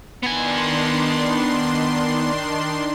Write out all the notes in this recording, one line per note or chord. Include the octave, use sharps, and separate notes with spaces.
D#3 B3 D4 G#5 C6